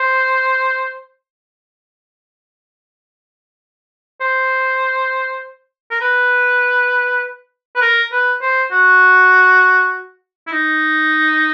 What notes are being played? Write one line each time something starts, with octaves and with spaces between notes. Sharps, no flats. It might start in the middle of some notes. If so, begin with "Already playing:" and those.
Already playing: C5
C5
A#4
B4
B4
A#4
B4
C5
F#4
E4
D#4